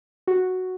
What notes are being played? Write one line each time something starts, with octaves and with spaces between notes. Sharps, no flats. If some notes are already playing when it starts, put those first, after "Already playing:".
F#4